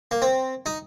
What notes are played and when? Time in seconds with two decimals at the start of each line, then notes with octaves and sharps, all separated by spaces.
0.11 A#3
0.22 C4
0.66 D#4